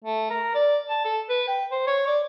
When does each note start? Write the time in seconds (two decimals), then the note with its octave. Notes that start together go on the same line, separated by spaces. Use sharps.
0.05 A3
0.30 A#4
0.55 D5
0.90 A5
1.05 A4
1.29 B4
1.48 G5
1.72 C5
1.87 C#5
2.07 D5